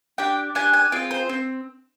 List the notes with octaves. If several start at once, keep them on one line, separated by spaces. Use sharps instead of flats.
D4 G4 G5
D4 G4 G#5
G#5
C4 F4 G#4 G5
C5
C4